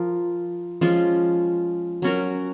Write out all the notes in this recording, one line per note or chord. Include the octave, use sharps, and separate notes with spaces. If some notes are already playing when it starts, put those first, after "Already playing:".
Already playing: F3 F4 A#4
F3 G#3 C#4 F4
F#3 C#4 F#4 A#4